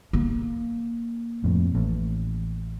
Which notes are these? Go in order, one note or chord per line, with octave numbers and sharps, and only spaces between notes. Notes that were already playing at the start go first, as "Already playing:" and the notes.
A#3
F2 A2
A1